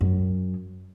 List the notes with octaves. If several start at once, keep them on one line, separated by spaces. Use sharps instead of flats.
F#2